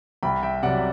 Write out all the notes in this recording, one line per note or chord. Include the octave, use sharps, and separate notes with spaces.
C2 G5 B5
E5 G5
C3 F#3 D5 F#5